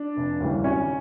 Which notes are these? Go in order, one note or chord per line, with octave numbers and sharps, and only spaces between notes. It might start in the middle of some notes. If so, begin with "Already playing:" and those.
Already playing: D4
F1
D#2 C#3 E3 G3
G#1 C#4